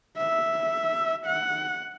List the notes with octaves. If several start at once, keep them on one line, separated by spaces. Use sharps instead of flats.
E5
F#5